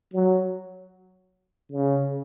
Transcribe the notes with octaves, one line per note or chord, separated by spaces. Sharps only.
F#3
C#3